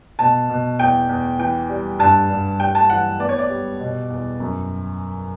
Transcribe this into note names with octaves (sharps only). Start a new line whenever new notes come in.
B2 A5
B2
E2 G5
E2
E3 G5
G3
G2 A5
G2
G3 G5
A5
E3 F#5
B3 D5
C#5
D5
G3
B2
E2
F#2